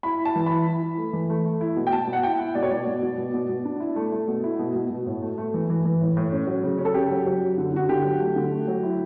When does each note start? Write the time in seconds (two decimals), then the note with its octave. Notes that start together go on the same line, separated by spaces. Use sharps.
0.03 E4 B5
0.20 E4
0.25 A5
0.35 E3
0.46 E4 B5
0.66 E4
0.83 E4
0.98 A3
1.13 E3
1.30 A3
1.45 A3
1.61 E4
1.76 B2
1.87 G5
1.92 B2 A5
2.07 B2
2.13 F#5
2.23 E4 G5
2.40 E4
2.55 B2 D5
2.63 C#5
2.70 B2 D5
2.87 B2
3.03 B2
3.18 B2
3.34 B2
3.49 B2
3.65 D4
3.80 E4
3.96 A3
4.12 A3
4.28 B2
4.44 E4
4.59 B2
4.75 B2
4.90 B2
5.06 A2
5.22 A3
5.38 A3
5.54 E3
5.70 E3
5.85 E3
6.01 A2
6.17 A2
6.32 C#4
6.47 F#3
6.63 C#3
6.78 C#4
6.85 A4
6.94 C#3 G4
7.10 F#3
7.26 F#3
7.42 F#2
7.58 D3
7.73 D3 F#4
7.89 D3 G4
8.05 F#3
8.20 A3
8.36 D3
8.51 A3
8.68 F#3
8.83 E4